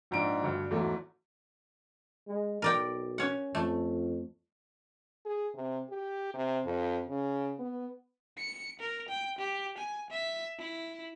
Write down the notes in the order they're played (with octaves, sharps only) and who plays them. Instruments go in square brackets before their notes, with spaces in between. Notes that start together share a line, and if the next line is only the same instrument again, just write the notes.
[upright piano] A#1 G#2 D4 D7
D2 G2
E2 G#2 F#3 A3
[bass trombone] G#3
[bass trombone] B1 [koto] A#4 D5 G5
[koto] C#4 F#5
[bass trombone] F2 [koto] A3
[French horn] G#4
C3
G4
C3
F2
C#3
B3
[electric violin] C#7
A#4
G5
G4
G#5
E5
E4